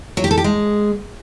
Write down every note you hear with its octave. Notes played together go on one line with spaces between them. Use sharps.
F#3
G4
A4
G4
G#3